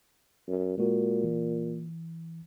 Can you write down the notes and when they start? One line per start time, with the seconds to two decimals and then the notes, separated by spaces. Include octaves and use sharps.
0.48 F#2
0.78 A#2 G#3 F#4 A#4
1.24 E3